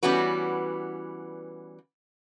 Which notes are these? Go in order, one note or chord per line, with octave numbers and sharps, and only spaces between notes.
E3 G3 B3 C#4 F#4 B4